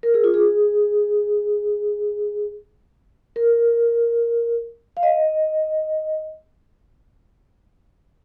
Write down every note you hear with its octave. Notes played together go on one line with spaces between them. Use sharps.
A#4
G#4
F4
G#4
A#4
F5
D#5